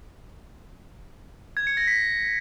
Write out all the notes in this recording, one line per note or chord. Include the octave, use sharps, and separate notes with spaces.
G#6
C#7
A#6
B6